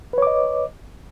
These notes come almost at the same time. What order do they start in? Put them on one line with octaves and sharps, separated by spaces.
B4 C#5 D6 D#5